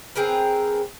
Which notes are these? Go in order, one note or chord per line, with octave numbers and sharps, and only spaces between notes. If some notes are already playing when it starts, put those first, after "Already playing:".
C4 G#4 A#4 B4